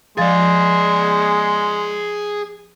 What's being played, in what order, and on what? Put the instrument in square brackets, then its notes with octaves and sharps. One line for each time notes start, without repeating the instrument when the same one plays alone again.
[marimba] F3 F5 A6 [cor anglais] G#3 [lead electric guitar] G#4 D5